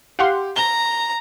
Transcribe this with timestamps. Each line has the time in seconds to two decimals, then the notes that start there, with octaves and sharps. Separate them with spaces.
0.19 G4 F5 F#5 C6
0.56 A#5 G7